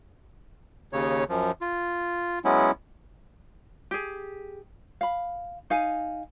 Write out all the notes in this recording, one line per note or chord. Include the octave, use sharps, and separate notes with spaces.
D#2 C#3 C#5
F#2 F3
F4
F#3 G#3 B3 C#4 E4
G4 G#4
F5 B5
D#4 F5 G#5